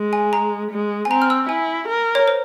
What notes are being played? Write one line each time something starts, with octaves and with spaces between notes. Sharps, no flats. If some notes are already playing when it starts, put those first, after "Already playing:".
Already playing: G#3
G#5
A#5
G#3
G#5
C4 A#5
F6
E6
E4 G#5
A#4
C#5
C5